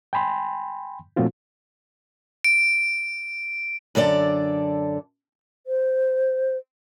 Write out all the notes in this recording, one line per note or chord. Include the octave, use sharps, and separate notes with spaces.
G5 G#5 B5 C6
A#2 F3 A3 C4 F4 F#4
D7
F#2 D3 A4 D5
C5